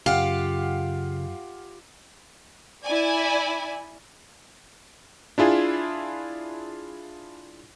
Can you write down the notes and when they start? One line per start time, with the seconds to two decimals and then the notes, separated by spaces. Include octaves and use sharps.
0.06 F#2 C#3 F4 G4 F5 F#5
2.84 E4 D5 G#5
5.38 D4 E4 F4 G#4